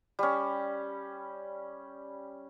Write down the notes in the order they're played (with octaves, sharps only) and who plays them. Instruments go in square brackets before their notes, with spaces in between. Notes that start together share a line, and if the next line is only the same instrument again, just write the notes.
[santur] G3 C#4